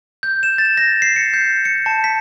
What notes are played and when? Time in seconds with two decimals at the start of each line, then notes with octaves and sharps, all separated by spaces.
0.23 G6
0.43 E7
0.58 A6
0.77 A#6
1.02 C7
1.16 C#7
1.34 G6
1.65 C#7
1.86 A5
2.04 B6